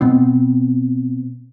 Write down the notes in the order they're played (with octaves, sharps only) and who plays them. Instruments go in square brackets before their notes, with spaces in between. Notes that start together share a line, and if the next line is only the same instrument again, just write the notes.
[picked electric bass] B2 B3 C4